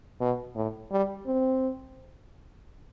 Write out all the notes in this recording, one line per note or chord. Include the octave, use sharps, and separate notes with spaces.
B2
A2
G3
C4